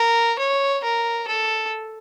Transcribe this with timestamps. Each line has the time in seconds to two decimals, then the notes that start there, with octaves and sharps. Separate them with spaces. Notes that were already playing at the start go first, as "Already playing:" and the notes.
Already playing: A#4
0.39 C#5
0.84 A#4
1.28 A4